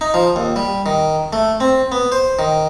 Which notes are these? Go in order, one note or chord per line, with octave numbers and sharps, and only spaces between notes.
D#4
F3
D#2
G3
D#3
A3
C4
B3
C5
D#3